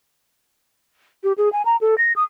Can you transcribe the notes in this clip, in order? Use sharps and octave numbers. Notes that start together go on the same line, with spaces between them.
G4
G#4
G#5
A#5
A4
A#6
D#6